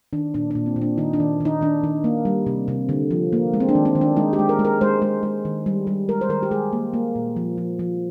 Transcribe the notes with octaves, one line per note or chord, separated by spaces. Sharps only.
D#3 D4
A#2 D4
A#2 D4
C4
A#2
D4
D#3 D#4
D4
D#3
D#3 D#4
D#3 D4
D#3
A#3
G3
C3
C3
D3
F3
A#3
G#3
C4
D4
D#3
C4
D#3
D4
G#3 D#4
G4
G#3
A#4
G#3
A#4
G#3 C5
G#3
G#3
D#3
G3
G3
G#3 A#4
C5
D#3 A#4
G4
G#3 G#4
A#3
A#3
A#2
F3
F3
F3